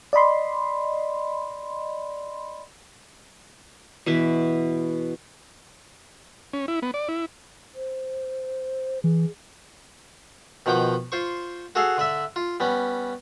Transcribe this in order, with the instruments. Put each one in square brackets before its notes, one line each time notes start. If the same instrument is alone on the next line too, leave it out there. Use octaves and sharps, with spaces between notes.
[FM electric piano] D5 D#5 B5 C6
[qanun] B2 E3 E4 B4
[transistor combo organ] C#4
E4
B3
D5
E4
[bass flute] C5
[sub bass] E3 [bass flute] G#4
[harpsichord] B2 D#3 F3 F#5 G5 D6
F4 C5 C#6
F#4 G#4 A4 F5 F#5 G#5
D3 D5 E5
F4
G3 B3 C#4